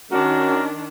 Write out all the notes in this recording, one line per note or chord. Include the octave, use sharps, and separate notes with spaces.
D#3 C#4 D4 F#4 A#4